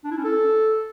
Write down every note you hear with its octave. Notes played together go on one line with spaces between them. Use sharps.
D4
E4
C#4
A4